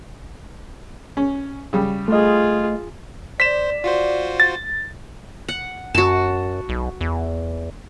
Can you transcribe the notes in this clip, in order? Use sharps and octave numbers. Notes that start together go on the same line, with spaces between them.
C#4
C#3 G3
A3 F4 G#4 D#5
C5 D5 B6 E7
F4 F#4 C5
A6
F#5
F#2 F#4 A5
B1
E2